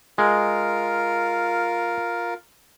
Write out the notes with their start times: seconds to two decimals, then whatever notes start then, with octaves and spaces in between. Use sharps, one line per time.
0.18 G#3 F4 A#4